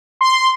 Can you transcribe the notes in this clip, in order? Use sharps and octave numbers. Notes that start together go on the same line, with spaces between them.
C6